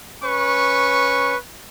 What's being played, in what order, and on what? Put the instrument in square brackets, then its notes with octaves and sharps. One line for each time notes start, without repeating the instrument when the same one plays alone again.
[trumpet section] C#4 B4 C#6